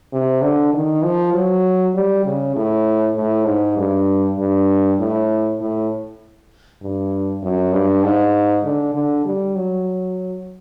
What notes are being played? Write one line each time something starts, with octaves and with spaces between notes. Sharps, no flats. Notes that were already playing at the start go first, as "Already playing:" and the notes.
C3
D3
D#3
F3
F#3
G3
C#3
A2
A2
G#2
G2
G2
A2
A2
G2
F#2
G2
G#2
D3
D3
G3
F#3